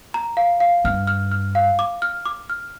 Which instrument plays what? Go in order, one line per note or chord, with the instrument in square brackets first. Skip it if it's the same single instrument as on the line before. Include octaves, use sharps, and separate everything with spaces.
[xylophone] A#5
F5
F5
[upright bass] G2 [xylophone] F6
[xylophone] F6
F6
F5
D6
F6
D6
F6